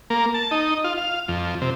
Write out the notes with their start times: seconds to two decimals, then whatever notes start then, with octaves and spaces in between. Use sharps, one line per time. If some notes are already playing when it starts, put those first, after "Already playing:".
0.10 A#3
0.34 A5
0.51 D#4
0.84 F4
0.98 F5
1.28 F2
1.62 C3